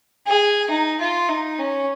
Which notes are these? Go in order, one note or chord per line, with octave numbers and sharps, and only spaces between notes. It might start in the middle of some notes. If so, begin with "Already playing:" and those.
G#4
D#4
F4
D#4
C#4